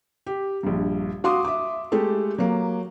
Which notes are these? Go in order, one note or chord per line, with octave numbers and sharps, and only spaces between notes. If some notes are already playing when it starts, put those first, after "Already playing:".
G4
A#1 G2
F#4 F5 C6 D6 D#6
E5 D6
G#3 A3 G4 A4
F#3 A#3